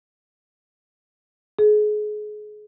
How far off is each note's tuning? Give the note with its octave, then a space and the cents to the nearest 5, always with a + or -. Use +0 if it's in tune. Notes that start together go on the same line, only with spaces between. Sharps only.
G#4 +30